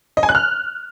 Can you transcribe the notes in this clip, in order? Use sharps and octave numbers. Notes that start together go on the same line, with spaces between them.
D#5
G#5
F#6
F6